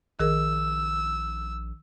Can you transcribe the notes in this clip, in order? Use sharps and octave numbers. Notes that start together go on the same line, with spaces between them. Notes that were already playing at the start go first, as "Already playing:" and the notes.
A#1 D#3 G#4 A#4 E6